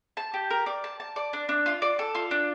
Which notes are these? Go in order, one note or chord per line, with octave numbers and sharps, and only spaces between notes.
A5
G4
A#4
D5
A5
A5
D5
D4
D4
F4
D5
A4
F4
D4